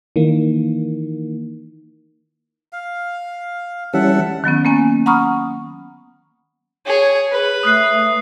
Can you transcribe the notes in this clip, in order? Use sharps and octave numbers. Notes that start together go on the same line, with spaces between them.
D#3 E3 A#3
F5
E3 G3 C#4 A4 E5 F#5
D#3 F#3 B3 C#4
A#3 B3 C#4 G#5
F#5 A#5 B5 C#6 D#6 F6
G#4 C#5
G#4 B4
A3 D#6 F#6 C7